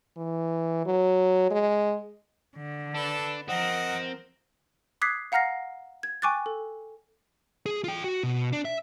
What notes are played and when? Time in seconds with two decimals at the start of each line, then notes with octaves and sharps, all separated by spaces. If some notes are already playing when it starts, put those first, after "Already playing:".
0.17 E3
0.86 F#3
1.51 G#3
2.57 D3
2.95 D4 A4 B4
3.48 F3 C4 A#4 D#5 F#5
5.01 D6 D#6 F#6 G#6 B6 C7
5.32 F5 F#5 A#5 F6 A#6 C7
6.03 G#6
6.22 G5 G#5 C#6 D6 F#6 A6
6.46 A4
7.66 G#4
7.84 F4 G5
8.04 F#4
8.23 B2
8.53 D4
8.65 E5